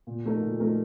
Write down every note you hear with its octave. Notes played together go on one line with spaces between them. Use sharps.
A#2
F3 A3 D#4 A#4
A#2
F3 A3 D#4 A#4